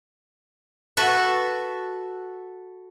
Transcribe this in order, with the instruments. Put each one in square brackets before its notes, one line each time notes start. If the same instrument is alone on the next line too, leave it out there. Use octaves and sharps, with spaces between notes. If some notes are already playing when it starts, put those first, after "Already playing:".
[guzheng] F#4 A4 B4 E5